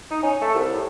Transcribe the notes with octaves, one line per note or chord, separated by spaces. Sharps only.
D#4
C#4
A3
C2
A2